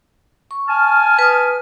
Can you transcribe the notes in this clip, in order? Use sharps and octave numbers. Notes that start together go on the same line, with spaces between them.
C#6
G#5 A5 F6
B4 D#6